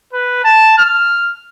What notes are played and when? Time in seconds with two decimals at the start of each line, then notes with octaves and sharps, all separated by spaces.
0.13 B4
0.44 A5
0.78 F6